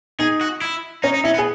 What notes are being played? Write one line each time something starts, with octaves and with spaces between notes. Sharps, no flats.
D#4 G#4
F#4
E4
C#4 D#4
D#4
C#4 E4
B3
G#4